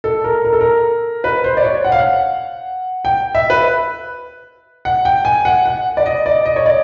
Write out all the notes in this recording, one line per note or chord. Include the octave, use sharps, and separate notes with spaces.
A4
A#4
A#4
A4
A#4
B4
C5
D5
C#5
F#5
F5
F#5
G5
E5
B4
F#5
G5
G#5
F#5
F#5
D5
D#5
D5
D#5
C#5
D5